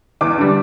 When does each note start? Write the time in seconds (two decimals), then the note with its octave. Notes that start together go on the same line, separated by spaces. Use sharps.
0.21 E2 D6
0.38 D3 G3